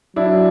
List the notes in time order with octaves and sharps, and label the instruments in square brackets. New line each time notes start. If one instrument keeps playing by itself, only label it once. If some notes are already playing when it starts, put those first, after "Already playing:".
[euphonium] F#3 [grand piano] D4 E4